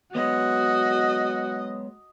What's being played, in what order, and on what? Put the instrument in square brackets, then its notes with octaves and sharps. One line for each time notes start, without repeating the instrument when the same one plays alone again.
[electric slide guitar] F#3 G#3 B3 [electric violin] F#4 [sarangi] D#5